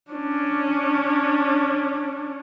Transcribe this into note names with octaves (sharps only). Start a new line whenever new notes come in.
C#4 D4